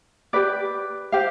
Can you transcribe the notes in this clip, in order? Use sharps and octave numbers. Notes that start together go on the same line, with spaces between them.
G4 B4 D5
G4 C5 F5